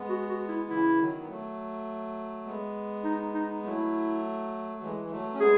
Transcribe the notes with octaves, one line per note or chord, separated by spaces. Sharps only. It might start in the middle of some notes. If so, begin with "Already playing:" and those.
Already playing: G#3 B3
F#4
F#4
E4
C#3 E3 E4
D#3 F#3
B3
F#3 A3
G#3 B3
D#4
D#4
F#3 A3 E4
E3 G#3
G#3
F#3 A3
C#4
G#3 B3 G#4